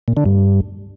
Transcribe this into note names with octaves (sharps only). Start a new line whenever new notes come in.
A#2
D3
G2